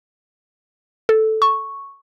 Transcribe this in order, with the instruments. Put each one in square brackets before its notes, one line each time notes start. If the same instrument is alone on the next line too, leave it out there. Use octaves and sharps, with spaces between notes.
[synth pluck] A4
C#6